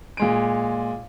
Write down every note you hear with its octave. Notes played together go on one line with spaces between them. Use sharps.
A#2 G#3 D7